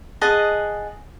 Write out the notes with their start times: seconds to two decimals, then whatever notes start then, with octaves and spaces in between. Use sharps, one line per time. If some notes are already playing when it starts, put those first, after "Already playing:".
0.21 G#4 D#5 F#5 A5